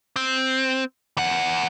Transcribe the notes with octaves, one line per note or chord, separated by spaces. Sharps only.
C4
E2 F#5